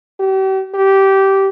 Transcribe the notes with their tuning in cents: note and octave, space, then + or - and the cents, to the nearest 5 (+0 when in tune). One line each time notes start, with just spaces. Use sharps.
G4 -40
G4 -15